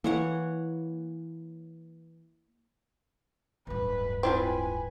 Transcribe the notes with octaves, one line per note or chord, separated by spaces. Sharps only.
E3 A#3 C#5 F#5
D1 G2 B4
C4 E4 F4 B4 G#5